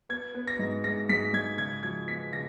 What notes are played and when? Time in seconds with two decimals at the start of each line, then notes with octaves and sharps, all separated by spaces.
0.09 B3 G#6
0.34 B3
0.47 A#6
0.59 G#2
0.84 G#2 A#6
1.09 G#2 B6
1.33 G#2 G#6
1.58 C#3 G#6
1.83 F3 G#6
2.08 B3 B6
2.33 C#3 A#6